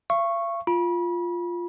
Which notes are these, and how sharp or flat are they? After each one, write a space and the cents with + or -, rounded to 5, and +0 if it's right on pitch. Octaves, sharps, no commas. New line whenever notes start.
F5 -45 C#6 -10
F4 +0 B5 -35